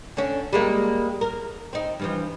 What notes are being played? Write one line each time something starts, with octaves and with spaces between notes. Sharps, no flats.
D3 C#4
G3 G#3 A#3
A#4
C4 D#4
G2 E3 F3